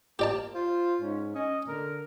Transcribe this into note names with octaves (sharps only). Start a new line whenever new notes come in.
A#3 G4 D5 A5
F4 C5
G#2 C#4
C#4 D#5
D3 A#4